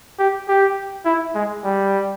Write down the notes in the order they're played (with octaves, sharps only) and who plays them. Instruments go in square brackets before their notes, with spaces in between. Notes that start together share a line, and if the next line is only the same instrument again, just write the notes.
[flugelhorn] G4
G4
E4
G#3
G3